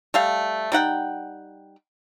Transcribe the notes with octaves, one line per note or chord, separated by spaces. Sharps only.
G3 A3 F5
G3 D#4 F#5 G5